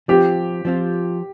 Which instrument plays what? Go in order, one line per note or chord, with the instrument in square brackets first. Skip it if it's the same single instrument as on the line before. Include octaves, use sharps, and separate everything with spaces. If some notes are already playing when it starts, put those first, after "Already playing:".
[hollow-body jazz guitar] F3 C4 F4 [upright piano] G4
[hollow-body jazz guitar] F3 C4 F4